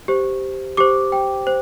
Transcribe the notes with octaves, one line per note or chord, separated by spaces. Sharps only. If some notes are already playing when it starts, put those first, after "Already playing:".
G4 C5
G4 C5 D6
G5
C5